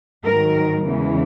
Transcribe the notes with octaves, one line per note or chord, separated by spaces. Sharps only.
G#2 D#3 F#3 A#4
E2 C#3 E3 G#3